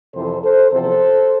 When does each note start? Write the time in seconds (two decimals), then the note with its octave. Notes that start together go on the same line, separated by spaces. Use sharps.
0.14 F2 C3 E3 A4 C5
0.42 A4 C5
0.70 E2 C3 F3 C4 A4 C5